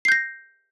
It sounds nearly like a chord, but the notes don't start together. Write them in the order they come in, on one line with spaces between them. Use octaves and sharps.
C7 G6 A#6